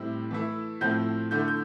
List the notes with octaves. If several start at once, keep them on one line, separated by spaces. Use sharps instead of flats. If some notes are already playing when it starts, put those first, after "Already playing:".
Already playing: A2 G3 C4 E4
E3 A3 E4
A2 F3 A3 C4 E4 G6
D3 A3 E4 G6
G6